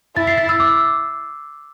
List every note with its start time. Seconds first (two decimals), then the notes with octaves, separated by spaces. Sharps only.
0.17 E4 A6
0.27 C7
0.38 A6
0.49 E6
0.60 D6